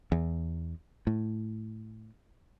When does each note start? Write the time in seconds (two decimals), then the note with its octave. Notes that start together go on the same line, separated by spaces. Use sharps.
0.12 E2
1.07 A2